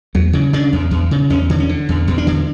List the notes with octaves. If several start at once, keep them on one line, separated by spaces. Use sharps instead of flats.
E2 F#3
C#3 E3
C#3 D4
E2
E2
C#3
E2 C#4
D3
C#4
D3
E2
E2
D4
D3